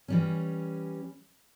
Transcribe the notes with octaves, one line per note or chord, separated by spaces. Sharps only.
E3 G3 C#4